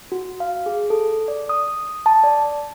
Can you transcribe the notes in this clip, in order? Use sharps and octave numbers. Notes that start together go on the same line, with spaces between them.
F#4
F5
G#4
A4
D5
D#6
A5
D5